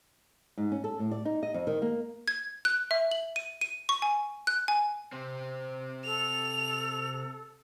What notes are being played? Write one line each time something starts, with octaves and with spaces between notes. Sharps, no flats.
G#2
C#4
A4
A2
D5
D#4
D#5
F2
D#3
A#3
G#6
F#6
E5
F#7
D#7
D#7
C#6
G#5
F#6
G#5
C3 C4
A4 F7